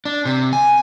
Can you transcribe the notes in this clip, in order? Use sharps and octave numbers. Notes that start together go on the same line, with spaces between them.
D4
C3
G#5